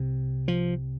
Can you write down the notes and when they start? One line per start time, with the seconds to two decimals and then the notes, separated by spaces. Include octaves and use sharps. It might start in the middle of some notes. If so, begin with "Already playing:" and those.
Already playing: C2 C3
0.48 F3